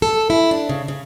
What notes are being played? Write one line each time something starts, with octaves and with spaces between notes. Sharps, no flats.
A4
E4
D4
C#3
C#3